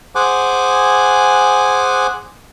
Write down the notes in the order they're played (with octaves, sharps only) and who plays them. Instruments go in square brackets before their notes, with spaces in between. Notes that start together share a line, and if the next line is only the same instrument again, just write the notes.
[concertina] G#4 C5 F#5 G#5 D6